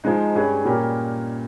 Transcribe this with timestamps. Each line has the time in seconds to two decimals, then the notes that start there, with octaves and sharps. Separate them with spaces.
0.04 G#2 F3 G#3 D#4
0.35 G2 G3 C#4 G#4
0.65 A#2 G3 C#4 G4 A#4